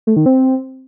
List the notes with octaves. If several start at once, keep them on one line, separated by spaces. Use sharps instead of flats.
A3
D#3
C4